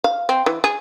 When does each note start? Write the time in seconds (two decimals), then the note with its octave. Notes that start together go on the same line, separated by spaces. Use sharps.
0.04 F5
0.29 C4
0.46 E3
0.64 G#4